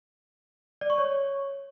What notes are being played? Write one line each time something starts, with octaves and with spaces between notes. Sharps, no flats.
D5
C#6
C#5